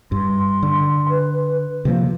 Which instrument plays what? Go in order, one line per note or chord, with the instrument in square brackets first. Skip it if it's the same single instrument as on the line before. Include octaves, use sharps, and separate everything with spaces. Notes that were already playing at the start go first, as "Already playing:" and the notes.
[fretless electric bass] G2 [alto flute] C6
[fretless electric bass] D3
[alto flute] B4
[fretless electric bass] C3 E3 F3 [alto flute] A#3